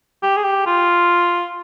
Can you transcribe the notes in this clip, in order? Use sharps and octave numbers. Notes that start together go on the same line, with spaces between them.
G4
G#4
G4
F4